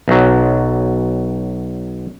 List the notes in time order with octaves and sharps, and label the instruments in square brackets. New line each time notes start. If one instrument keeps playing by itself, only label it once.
[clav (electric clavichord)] B1 F#3